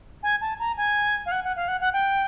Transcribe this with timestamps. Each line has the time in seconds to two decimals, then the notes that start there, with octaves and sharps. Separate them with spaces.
0.23 G#5
0.41 A5
0.60 A#5
0.77 G#5
1.26 F5
1.32 F#5
1.44 F#5
1.56 F5
1.68 F#5
1.81 F#5
1.93 G5